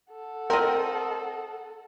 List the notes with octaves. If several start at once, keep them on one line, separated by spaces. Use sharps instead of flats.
A4 F#5
C4 A#4 D#5